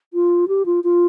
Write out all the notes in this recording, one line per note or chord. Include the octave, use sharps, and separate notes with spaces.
F4
G4
F4
F4